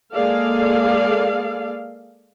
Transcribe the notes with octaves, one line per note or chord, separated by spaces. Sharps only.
G#3 A#3 G#4 A4 D5 F5